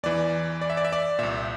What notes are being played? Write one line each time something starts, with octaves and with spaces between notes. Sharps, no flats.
E2 E3 D5
D5
E5
D5
E5
D5
C2 A#2 E5